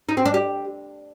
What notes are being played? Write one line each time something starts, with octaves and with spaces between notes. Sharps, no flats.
D#4
C4
D4
G4